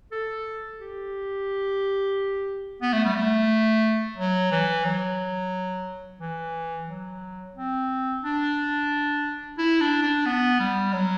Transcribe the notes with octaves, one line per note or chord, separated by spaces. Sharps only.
A4
G4
B3
A3
G3
A3
F#3
E3
F#3
E3
F#3
C4
D4
E4
D4
D4
B3
G3
F#3